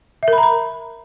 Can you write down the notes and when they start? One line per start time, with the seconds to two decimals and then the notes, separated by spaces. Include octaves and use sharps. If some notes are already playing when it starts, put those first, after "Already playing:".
0.23 E5
0.28 A#4
0.33 B5
0.38 A#5
0.43 B5